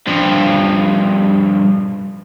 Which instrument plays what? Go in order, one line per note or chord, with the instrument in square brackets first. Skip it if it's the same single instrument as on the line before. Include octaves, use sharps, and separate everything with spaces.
[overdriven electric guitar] G2 F3